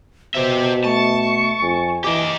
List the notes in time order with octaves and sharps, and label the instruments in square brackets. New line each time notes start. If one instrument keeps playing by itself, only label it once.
[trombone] B2 [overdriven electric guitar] G4 E5 [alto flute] C5
[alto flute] A3 [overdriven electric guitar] A5 [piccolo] C#6
[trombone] F2 [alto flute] G#5
[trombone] E3 [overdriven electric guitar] G4 D#5 [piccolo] D6